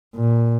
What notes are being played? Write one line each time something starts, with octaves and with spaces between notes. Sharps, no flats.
A#2